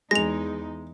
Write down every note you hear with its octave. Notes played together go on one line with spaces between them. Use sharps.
E2 G#3 D#4 A#6 F7